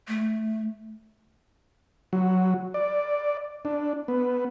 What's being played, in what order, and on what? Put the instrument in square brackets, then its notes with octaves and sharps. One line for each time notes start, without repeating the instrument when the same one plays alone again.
[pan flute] A3
[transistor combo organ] F#3
D5
D4
B3